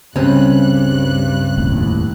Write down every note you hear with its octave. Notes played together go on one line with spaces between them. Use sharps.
C#2 G2 C4 C#4 F#6
F1 D#2 A2